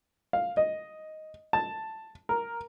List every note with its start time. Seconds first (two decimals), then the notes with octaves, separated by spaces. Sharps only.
0.33 F5
0.57 D#5
1.53 A5
2.29 A#4